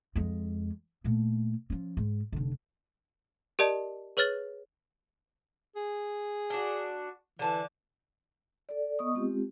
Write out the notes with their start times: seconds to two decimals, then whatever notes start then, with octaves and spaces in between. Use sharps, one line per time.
0.16 F2 G#3
1.04 A#2 A3
1.70 F3 C#4
1.97 G#2
2.32 F1 D3
3.59 G4 A#4 D5 D#5 A5
4.17 G#4 B4 C#5 F6 A6 F#7
5.76 G#4
6.50 D4 F#4
7.39 D3 E3 A5
8.69 A4 D5
8.99 B3 D#5 C#6 D#6
9.15 G#3 C4 F4 G4